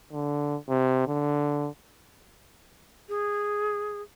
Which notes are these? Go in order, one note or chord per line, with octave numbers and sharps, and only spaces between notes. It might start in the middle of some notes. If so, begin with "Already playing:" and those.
D3
C3
D3
G#4